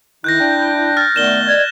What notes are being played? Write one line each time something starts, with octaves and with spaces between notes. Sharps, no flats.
D#3 E4 F#6 G6 A#6
D4 G5
F6 F#6 A6
D#3 A3 B3 D5 E7 G7
D5 D#5 G#6